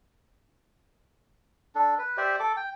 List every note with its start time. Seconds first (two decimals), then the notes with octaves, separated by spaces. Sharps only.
1.75 D4 A4
1.98 B4
2.17 G4 C5 D5 E5
2.39 A4 D6
2.57 G5